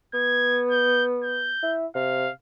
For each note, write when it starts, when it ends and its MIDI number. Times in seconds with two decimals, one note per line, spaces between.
0.14 1.53 59
0.14 0.62 92
0.71 1.03 91
1.24 1.76 91
1.63 1.86 64
1.95 2.28 48
1.95 2.32 77